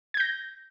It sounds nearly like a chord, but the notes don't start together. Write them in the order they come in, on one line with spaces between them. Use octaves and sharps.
G#6 G6 A#6